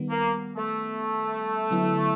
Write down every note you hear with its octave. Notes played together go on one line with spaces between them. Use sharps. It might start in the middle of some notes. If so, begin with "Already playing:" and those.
Already playing: D#3 G3 B3
A#3
A3
D3 F#3 B3 E4